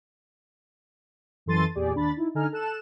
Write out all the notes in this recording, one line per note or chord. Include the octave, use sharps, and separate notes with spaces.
F#2 E3 A4 C6 A6 D#7
E2 A#2 G4 G#4 D5
D#2 D4 B5 A6
D#4 E4
D3 D#4 A4 G#5 A#5 F6
A4 F#6 E7